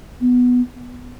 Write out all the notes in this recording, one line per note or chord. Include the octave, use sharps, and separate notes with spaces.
B3